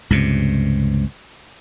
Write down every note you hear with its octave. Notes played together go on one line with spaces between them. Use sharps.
C#2 G2 C3